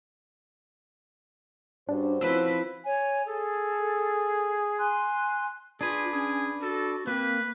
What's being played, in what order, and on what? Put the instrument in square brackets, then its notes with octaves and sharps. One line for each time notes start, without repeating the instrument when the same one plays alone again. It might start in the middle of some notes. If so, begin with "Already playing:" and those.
[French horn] G2 [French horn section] C#4 F#4 C5 [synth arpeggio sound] D4
[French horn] F3 [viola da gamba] C4 E4 B4 [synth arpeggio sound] E6
[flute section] C#5 G#5
[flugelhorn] G#4 [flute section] A4
[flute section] G#5 C6 F#6
[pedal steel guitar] D4 B4 [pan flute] F4 [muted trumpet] G#4
[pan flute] C#4 [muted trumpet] G#4
[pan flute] F#4 [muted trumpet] A4
[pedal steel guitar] A#3 [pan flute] C4 [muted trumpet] B4